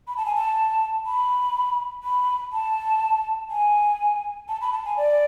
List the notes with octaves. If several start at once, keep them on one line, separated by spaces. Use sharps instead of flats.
B5
A5
G#5
A5
B5
B5
A5
G#5
A5
B5
A5
G#5
D5